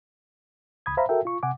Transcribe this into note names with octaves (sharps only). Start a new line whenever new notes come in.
C#2 B5 D#6 G#6
C5 E5 F5 A#5 B5
F#4 A4 A#4 E5 G5
F4 C#6
C3 F#5 G#5 D6